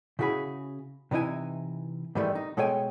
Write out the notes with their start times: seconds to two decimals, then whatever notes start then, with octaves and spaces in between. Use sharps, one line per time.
0.19 C#3 E4 F#4 G#4 B5
1.11 C3 E3 D#4 E4 G#5
2.15 G#2 D#3 E3 G3 A3
2.35 D#4
2.57 B2 G#3 A4 C#5 G5 G#5